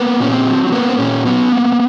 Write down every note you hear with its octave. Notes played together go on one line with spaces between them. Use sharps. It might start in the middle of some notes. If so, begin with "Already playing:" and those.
Already playing: A#3 B3
A#2 C#4
C4
F#3
C4
A#3 B3
C4
A#2 C#4
F#3 B3
A#3